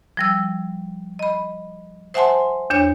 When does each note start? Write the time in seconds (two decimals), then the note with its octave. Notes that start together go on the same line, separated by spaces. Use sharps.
0.17 F3 G3 E6
1.19 D#5 B5
2.14 C5 E5 F#5 G#5 A5 C6
2.70 E2 D4 C#5 G6